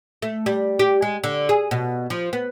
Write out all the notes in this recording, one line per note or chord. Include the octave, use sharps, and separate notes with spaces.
A3
G3
G4
G#3
D3
G#4
B2
F3
B3